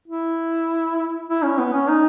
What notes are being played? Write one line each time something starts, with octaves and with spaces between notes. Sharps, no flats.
E4
E4
C#4
B3
C#4
D#4